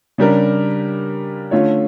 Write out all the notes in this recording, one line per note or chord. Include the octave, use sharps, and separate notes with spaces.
C#3 G3 D4 G4 A#4
D3 A3 C#4 F4 C#5